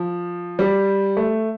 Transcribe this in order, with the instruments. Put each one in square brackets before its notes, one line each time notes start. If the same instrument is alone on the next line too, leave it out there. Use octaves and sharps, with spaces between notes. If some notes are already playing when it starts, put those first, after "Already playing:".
Already playing: [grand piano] F3
G3
A3